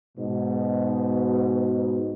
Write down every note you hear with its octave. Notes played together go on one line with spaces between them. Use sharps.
G#2 B2